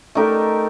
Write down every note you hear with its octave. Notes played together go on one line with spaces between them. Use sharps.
A3 D#4 G4 A#4